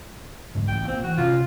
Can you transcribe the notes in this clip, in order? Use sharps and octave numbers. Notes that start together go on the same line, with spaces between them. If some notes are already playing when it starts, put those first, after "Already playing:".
G#2 D3 F#3
A1 G5
A#2 C4
E3 F#4
C3 C#4 F4